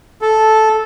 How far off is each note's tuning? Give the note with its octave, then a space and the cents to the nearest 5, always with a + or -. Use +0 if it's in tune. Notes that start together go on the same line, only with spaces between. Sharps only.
A4 -10